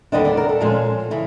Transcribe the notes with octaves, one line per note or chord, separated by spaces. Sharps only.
D#2 D3 G3 B3 D4 D#5
D5
A#4
A4
A#2 F3 G#3 C#4
C#3 E3